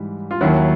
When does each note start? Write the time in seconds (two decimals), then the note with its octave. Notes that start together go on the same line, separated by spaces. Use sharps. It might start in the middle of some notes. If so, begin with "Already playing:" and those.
Already playing: G#2 E3 G3
0.31 F4
0.41 D#2 D#3 F#3 E4 F#4